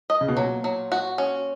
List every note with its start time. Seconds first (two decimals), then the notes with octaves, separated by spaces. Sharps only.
0.10 D#5
0.21 C#3
0.28 B2
0.36 A#2 F#3
0.64 F#3
0.92 F#4
1.18 C#4